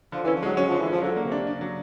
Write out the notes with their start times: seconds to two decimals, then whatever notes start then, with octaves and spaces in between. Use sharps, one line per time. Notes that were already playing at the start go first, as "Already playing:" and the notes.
0.12 D3 F3
0.24 E3 C#4
0.35 F3
0.43 F#3 G#3
0.57 F#3 C#4
0.68 D3 F3
0.80 E3
0.87 F3 C#4
1.02 D3 F#3
1.16 A#3
1.25 C3
1.32 D4
1.46 C#3 D4
1.61 F#3